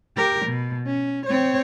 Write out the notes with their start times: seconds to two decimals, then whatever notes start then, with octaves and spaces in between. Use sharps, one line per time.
0.17 G4 A#4
0.46 B2
0.86 C#4
1.26 C4 C#5